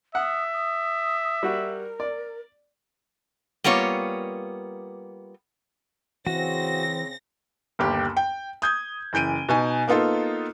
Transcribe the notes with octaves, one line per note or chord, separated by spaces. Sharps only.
E5 F#5 D#6
D#6
G3 F#4 A#4
D5
G3 A#3 B3 F4 C#5
C#3 E3 C4 F#4 A#6
G1 D#2 G4
G5
D#6 G6 G#6
F#1 E3 G6 D7 D#7
B2 D#4 G#5
A#3 B3 D#4 F4 A4